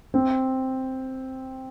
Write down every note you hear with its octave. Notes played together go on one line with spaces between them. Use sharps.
C4